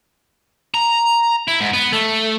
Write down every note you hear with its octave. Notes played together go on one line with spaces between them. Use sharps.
A#5
E4
G#2
B3
A3